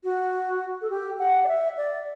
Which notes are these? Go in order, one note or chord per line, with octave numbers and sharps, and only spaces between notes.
F#4
A4
G4
F#5
D5
E5
D5